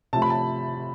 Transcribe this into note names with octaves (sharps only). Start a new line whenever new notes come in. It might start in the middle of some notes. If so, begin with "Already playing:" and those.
C3 F3 A3 A5
B5
A5